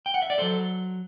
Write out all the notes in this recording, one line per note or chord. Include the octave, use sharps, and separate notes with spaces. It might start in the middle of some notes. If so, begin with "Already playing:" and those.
G5
F#5
E5
D5
F#3 A4 C5